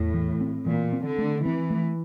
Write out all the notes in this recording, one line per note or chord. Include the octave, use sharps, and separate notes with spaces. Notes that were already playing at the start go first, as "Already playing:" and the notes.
Already playing: E2 A2
E3
C4
A#2 E3
C4
D3
A3
E3 C4
A3